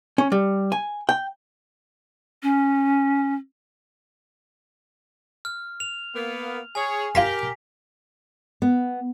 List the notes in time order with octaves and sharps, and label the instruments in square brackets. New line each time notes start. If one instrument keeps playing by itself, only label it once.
[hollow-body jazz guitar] C#4
G3
G#5
G5
[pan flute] C#4
[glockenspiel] F6
F7
[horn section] A#3 B3
[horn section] G#4 C#5 [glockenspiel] G#5
[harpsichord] F4 G#5 C6 [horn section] G4 A#4 [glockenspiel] B6
[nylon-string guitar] B3